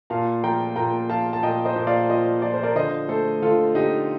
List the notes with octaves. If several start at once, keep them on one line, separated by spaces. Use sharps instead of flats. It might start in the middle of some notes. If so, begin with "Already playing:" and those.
A#2 F5 A5
F3 G5 A#5
A#2 G5 A#5
F3 F5 A5
A5
A#2 D#5 G5
C5 D#5
A#2
D5 F5
F3 C5 D#5
F3 D5
C5
A#4 D5
D3 C5 D#5
A3 A4 C5
D3 F4 A4
D3 D#4 G4